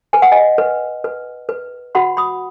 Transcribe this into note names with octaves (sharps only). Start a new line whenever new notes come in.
B4 G#5
F#5
D#5 G#5
B4
B4
B4
F#4 F#5 B5
B5 D#6